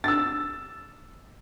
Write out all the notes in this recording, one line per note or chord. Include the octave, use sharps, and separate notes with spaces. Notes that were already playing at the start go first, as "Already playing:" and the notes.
E6 A6